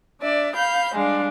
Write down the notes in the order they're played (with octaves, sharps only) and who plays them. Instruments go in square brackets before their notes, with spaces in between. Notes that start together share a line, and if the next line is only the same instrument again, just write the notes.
[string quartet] D4 D5 E5
F5 B5 G6
G3 G#3 D4 F5